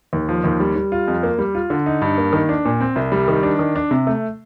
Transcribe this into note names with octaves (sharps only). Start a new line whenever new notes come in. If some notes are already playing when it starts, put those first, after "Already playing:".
D#2
F3
D#2
G3
G3
F4
F2
A#3
G3
F4
D3
D#4
G2
A#3
D#3
D4
A#2
C4
C2
G3
D#3
D4
D#3
D4
C3
A3